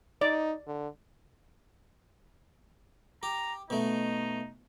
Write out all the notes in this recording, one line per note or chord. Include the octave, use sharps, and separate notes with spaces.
D#4 D5
D3
G4 A#5
B2 A3 D#4